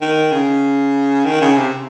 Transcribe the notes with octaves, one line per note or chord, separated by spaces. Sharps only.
D#3
C#3
D#3
C#3
C3